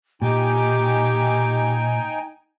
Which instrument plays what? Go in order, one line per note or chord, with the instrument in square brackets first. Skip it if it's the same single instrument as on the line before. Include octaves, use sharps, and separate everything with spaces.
[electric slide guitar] A#2 [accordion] D#4 G5 G#5 [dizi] G4